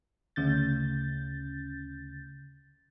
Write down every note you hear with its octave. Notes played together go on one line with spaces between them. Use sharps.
D2 C#3 G6 A6